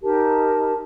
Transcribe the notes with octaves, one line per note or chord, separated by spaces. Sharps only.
D#4 G4 A#4 A5